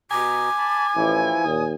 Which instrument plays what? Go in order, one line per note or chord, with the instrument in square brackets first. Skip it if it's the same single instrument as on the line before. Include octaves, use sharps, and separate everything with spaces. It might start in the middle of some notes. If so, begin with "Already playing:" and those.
[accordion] B2 A#5 D#6 [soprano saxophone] G#5 [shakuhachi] D6
[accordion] A5 B5
[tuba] A1 [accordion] E3 F3 E4
[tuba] D#2 [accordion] A#2 D#6